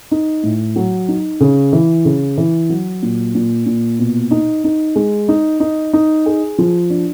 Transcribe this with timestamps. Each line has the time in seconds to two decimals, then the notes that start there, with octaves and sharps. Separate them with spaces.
0.11 D#4
0.43 A2
0.76 F#3
1.08 D#4
1.40 C#3
1.73 E3
2.05 C#3
2.38 E3
2.70 F#3
3.03 A#2
3.35 A#2
3.66 A#2
3.99 B2
4.31 D#4
4.64 D#4
4.96 G#3
5.29 D#4
5.60 D#4
5.93 D#4
6.26 G#4
6.58 F3
6.90 D4